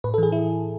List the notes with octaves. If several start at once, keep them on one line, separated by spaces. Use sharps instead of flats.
A2 B4
A4
E3 G#4
E4